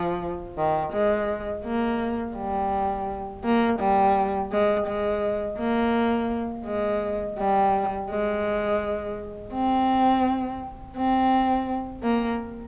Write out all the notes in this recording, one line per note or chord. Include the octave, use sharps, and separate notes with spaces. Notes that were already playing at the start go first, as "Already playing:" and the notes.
Already playing: F3
D#3
G#3
A#3
G3
A#3
G3
G#3
G#3
A#3
G#3
G3
G#3
C4
C4
A#3